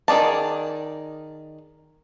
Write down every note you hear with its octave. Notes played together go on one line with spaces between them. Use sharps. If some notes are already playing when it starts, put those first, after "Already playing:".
D#3 G#4 D5 A5